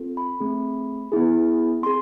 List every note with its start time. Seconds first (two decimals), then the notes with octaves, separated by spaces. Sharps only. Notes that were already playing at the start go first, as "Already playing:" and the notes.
Already playing: C4 F4 A4
0.17 B5
0.40 A3 C4 G#4
1.12 B3 E4 G#4
1.82 C4 G#4 C6